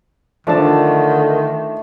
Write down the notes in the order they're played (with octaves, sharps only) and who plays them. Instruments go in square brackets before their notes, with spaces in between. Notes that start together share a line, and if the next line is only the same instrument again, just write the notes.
[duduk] D3 [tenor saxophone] D#3 [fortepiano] F3 D4 A5 [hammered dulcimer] A3